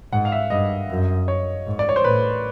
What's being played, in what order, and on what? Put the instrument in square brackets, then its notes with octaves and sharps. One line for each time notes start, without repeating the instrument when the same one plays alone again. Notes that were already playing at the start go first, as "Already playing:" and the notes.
[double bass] G#2 [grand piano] F#5
[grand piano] F5
E5
[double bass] G2 [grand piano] D#5
[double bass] F#2
[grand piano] C#5
[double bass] G#2
[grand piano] D5
C#5
C5
[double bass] A2 [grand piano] B4